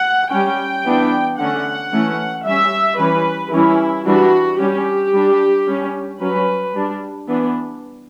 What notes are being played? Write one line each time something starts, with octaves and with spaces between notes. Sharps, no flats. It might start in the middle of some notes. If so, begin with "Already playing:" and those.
Already playing: F#5
G3 C#4 G5
E3 B3 D4
D3 A3 C#4 F#5
E3 A3 C#4
G3 C#4 E5
E3 G3 C#4 B4
E3 G3 C#4 E4
E3 G3 D4 F#4
G3 C#4 G4
G3 D4
G3 C#4
F#3 C#4 B4
G3 D4
E3 B3 D4